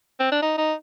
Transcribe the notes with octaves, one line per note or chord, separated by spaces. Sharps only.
C4
D4
D#4
D#4